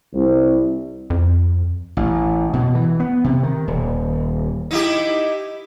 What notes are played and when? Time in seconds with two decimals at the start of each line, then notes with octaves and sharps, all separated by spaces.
0.12 C2
1.10 F2
1.97 A1
2.53 B2
2.75 E3
3.00 B3
3.24 C3
3.43 D#3
3.67 D#1
4.71 D#4 E4 G4